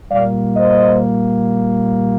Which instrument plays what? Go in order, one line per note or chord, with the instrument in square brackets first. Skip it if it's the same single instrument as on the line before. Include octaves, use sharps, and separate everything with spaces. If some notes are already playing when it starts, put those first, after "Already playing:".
[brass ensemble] A#2 G3 A#3 D5 F5
C5 D#5